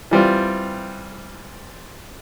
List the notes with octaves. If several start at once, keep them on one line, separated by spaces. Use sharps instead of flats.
E3 G3 C4 F4